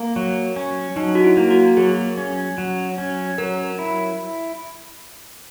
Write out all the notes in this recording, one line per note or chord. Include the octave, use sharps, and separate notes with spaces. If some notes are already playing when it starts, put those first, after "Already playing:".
Already playing: A#3
F#3
C#4
F#3 D#4
F#4
E4
A#3
F#4
F#3 G#4
C#4
F#3
C#4
F#3 A#4
E4